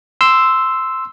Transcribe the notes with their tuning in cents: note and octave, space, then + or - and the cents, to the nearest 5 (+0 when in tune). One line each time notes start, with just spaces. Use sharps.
C6 -5 E6 +0